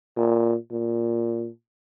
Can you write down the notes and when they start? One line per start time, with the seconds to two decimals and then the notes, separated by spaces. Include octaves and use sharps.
0.17 A#2
0.72 A#2